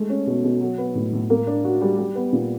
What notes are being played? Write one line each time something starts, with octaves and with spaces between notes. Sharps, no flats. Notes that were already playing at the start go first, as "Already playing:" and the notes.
Already playing: G#3 A3
C#4
B2
B2
F#3
B3
A2
A2
A#3
D4
F#4
G3
G3
B3
A#2